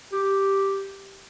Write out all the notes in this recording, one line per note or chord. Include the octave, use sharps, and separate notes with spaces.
G4